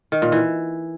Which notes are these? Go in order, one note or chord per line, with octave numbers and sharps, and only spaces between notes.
D#3
A#2
E3